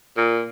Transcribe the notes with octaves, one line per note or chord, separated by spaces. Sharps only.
A#2